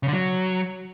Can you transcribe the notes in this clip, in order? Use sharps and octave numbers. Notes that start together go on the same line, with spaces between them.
C#3
D3
F#3